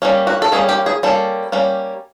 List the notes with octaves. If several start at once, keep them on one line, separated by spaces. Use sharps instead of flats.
G3 A#3 C#4
F#4
A4
G3 A#3 C#4 G#4
G4
G#4
G3 A#3 C#4 A4
G3 A#3 C#4